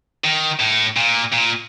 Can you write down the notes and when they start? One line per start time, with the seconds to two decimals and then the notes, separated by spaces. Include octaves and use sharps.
0.24 D#3
0.61 A2
0.97 A#2
1.32 A#2